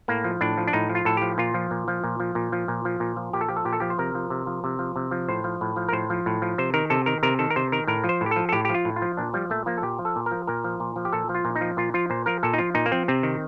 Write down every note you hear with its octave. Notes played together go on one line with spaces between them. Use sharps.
A2 A#3
F3
A2 D4
F3
D4
A2 D#4
F3
F4
A2 A4
F3 G4
A#2 F4
F3
A#2
F3
A#2
F3
A#2
F3
A#2
F3
A#2
F3
A#2 G4
A4
F3 G4
A4
A#2 G4
A4
F3 G4
C5
C3 A#4
F3
C3
F3
C3
F3
C3
F3
A2 C5
F3
A2
F3
A#4
A2 C5
F3
A2
F3
C3 C5
D#3 A#4
C3 A4
D#3 A#4
C3 A#4
D#3 A4
A#4
C3 C5
D#3 A#4
A2 A#4
F3
C5
A2
G4
F3 A4
A4
A2 G4
F3 G4
F4
A2
F4
F3
A#2 D4
F3 G3
A#2 A3
F3 A#3
A4
A#2 G4
F3
A4
A#2
A#4
F3
A#2 A#4
F3
A#2
F3
G4
A#2 A4
F3
F4
A#2
D#4
F3
A#2 F4
F3 F4
A#2 C5
F3 A#4
A#2 A4
D#4
F3 F4
A#2 D#4
A#3
F3 C4
C3 C4
D#3